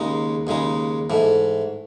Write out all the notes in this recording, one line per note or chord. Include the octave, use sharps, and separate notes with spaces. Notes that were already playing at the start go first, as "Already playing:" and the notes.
Already playing: D#2 C#3 G#3 D#4
D#2 C#3 G#3 D#4
G#2 E3 A3